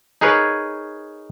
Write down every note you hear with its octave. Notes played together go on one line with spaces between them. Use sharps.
D#4 G#4 A#4 B4 C#5